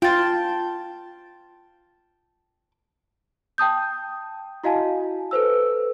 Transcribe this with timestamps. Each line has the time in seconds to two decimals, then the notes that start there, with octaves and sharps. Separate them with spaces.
0.02 F4 G5 A5
3.58 G5 A5 D#6 G6
4.64 E4 F#4 D#5 F5 G#5 A5
5.31 A4 B4 C5 E6